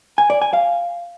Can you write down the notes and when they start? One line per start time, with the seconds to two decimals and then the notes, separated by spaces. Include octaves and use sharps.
0.18 G#5
0.30 D5
0.42 G#5
0.53 F5